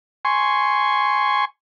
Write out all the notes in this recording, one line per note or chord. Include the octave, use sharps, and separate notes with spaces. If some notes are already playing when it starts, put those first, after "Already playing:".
G#5 C6 C#6